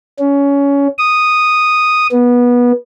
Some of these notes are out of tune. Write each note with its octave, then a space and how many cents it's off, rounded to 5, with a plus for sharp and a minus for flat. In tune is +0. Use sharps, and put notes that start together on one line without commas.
C#4 +20
D#6 -5
B3 -20